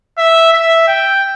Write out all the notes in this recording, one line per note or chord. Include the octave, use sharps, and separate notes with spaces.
E5
E5
G5